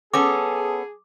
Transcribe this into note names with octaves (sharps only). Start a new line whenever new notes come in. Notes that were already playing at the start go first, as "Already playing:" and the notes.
B3 C#4 G#4 A4 A5 D6 D#6